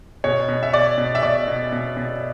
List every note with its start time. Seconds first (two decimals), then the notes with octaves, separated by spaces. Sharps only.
0.24 B2 C#5
0.49 B2
0.63 E5
0.73 B2 D5
0.98 B2
1.15 E5
1.22 B2 D5
1.48 B2
1.72 B2
1.97 B2